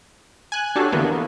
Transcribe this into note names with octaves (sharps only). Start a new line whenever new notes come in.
G#5 F#6
D4 F#4 G4 A4 C#5
D3 E3 A#3 B3